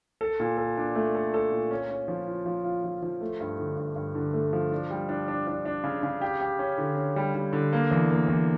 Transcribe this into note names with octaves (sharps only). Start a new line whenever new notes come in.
A4
A#2
A4
D4
A3
A4
A4
A#2
C#4
C#4
F3
F4
F3
F4
F3
F3
A3
G2
D3
G2
G2
D3
A3
F3
D4
G3
D4
D4
D4
D4
C#3
C#3
G4
G4
C#4
D3
C#4
G3
G3
D3
A#3
E2
A#3
E2